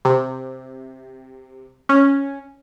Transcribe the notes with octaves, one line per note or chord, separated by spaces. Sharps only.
C3
C#4